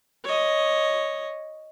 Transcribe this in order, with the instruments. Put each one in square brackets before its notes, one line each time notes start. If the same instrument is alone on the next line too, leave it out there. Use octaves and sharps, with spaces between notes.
[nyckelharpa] C#5 D#5